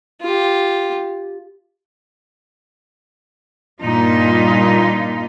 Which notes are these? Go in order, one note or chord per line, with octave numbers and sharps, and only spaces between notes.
F4 G4
G2 A#2 D#4 F4